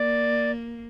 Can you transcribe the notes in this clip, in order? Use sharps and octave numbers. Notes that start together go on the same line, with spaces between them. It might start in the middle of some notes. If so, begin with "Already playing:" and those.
Already playing: A#3 D5